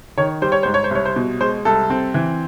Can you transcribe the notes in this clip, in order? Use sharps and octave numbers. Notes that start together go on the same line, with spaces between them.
D#3 C#5
G3 C5
C#5
G#2 C5
C#5
C5
C2 C#5
C5
B2
G#3 C5
C2 A4
C4
E3